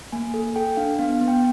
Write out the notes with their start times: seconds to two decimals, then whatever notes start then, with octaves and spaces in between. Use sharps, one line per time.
0.12 A#3 G#5
0.34 A4
0.56 A4 G5
0.77 D4 F5
0.99 B3 F5
1.21 B3
1.28 G5